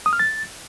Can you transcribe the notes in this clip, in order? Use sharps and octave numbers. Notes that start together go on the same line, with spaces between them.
D#6
F6
A6